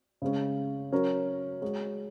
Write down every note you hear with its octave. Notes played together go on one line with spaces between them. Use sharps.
C#3 G#3 C#4
F#3 C#4 A#4 C#5
G#3 F#4 C#5